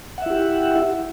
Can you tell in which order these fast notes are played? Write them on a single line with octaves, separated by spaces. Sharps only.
F#5 E5 E4 G4